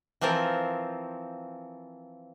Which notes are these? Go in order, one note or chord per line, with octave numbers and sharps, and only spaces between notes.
E3 F3 C4 F4 A#4